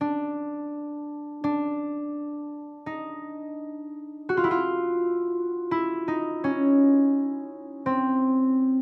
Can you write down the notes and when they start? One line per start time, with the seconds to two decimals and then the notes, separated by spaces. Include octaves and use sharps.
0.01 D4
1.44 D4
2.86 D#4
4.29 F#4
4.37 F4
4.44 E4
4.51 F4
5.71 E4
6.08 D#4
6.44 C#4
7.86 C4